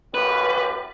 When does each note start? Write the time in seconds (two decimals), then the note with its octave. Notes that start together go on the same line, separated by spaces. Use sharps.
0.14 A1 F#2 G4 B4